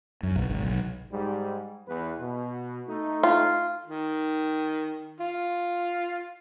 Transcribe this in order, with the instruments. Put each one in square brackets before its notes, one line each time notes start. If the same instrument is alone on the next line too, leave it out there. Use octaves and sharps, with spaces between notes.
[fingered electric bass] F#2
B1
G#1
B1
[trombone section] G#2 G3
E2 B4
B2
A3 D#4
[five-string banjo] F4
[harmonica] D#3
F4